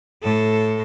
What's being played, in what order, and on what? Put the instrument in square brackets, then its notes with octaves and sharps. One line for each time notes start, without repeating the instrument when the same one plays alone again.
[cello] A2 A4